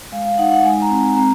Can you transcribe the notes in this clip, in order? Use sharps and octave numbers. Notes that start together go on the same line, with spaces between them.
G#3 F5
F5
D#4 F#5
F#5
G#3 G#5
A#5
C4
C4 A#5